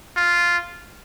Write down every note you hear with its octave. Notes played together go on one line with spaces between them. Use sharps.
F4